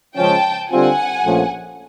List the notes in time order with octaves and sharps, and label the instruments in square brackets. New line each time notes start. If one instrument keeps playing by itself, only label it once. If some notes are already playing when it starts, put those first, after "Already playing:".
[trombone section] C#3 F3 G#3 C#4 [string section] G5 A5
[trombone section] D3 G3 C4 F4 [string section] F#5 G#5
[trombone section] A#1 A#2 F3 A3 C#4